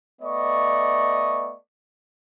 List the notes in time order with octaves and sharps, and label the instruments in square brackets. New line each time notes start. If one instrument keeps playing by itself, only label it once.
[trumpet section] A3 B3 D5 D#5 C#6